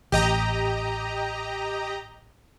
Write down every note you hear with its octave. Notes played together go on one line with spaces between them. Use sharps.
A1 G4 D#5 A#5